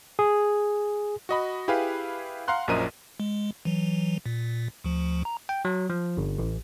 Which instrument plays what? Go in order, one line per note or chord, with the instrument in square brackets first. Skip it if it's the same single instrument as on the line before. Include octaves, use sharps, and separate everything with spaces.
[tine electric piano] G#4
[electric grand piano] F#4 D#5 B5
E4 G4 G#4 B4 F5
F5 F#5 A#5 C6 F#6
A#1 F#2 F3 A#4 D#5 D#7
[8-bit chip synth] G#3
E3 F#3
A#2
D2 F3
A#5
[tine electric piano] G5
F#3
F3
G1
A1